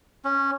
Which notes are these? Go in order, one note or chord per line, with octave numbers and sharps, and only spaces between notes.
C#4